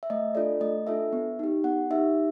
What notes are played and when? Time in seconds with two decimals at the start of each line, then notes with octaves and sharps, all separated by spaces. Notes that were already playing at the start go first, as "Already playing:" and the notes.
0.03 E5
0.10 A3 D#5
0.35 D4 F4 A4 D5
0.61 A3 D#5
0.87 D4 F4 A4 E5
1.13 B3
1.39 D#4 G4
1.64 B3 F#5
1.90 D#4 G4 E5